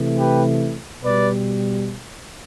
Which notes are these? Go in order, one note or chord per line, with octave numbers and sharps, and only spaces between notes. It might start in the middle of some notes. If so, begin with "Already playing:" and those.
Already playing: C3 E3 A3
G4 B4
B2 G3 B4 D5